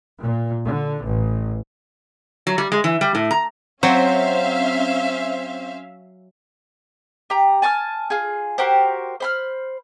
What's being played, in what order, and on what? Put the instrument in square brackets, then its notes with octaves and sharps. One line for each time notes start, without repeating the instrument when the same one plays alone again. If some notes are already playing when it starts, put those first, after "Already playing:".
[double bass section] A#2
D3
A1
[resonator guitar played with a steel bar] F#3
G3
G#3
E3
G3
A2
A#5
[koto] F#3 [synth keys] C4 C5 [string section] C#4 E5 F5
[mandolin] G4 A#5
G#5 A5 C#6 F6
F4 G#4
F#4 G4 A#4 C5
C5 B5 F6